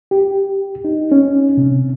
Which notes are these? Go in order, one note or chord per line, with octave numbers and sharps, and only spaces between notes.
G4
D#4
C#4
C3